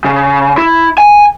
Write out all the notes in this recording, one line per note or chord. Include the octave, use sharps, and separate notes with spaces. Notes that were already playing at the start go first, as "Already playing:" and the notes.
C#3
E4
G#5